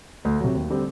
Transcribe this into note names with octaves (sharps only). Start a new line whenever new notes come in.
D2
C3 F#3
D#2
D3 G3 C4